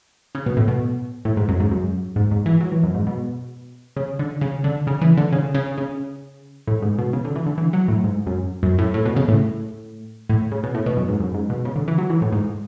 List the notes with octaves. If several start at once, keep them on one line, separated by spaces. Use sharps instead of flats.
C#3
B2
A2
B2
A2
G#2
F#2
G#2
F#2
G#2
G#2
E3
F#3
E3
F#2
G#2
B2
C#3
D3
C#3
D3
C#3
E3
D3
C#3
C#3
C#3
A2
G#2
B2
C#3
D3
E3
D3
E3
F#3
A2
G#2
F#2
F#2
A2
A2
B2
C#3
A2
A2
C#3
B2
A2
B2
F#2
G#2
F#2
G#2
B2
C#3
D3
E3
F#3
E3
A2
G#2